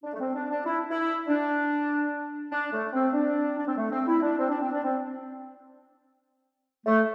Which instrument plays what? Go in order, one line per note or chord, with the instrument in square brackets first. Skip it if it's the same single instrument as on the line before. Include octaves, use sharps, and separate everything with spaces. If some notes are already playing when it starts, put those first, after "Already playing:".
[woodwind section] D4
A3
C4
D4
D4
E4
E4
D4
D4
A3
C4
D4
D4
C4
A3
C4
E4
D4
C4
D4
C4
D4
C4
A3